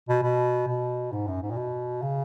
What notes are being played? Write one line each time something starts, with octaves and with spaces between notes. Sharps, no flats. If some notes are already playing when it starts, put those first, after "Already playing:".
B2
B2
B2
G#2
F#2
G#2
A#2
B2
C#3